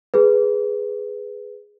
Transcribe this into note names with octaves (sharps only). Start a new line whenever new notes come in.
G#4 B4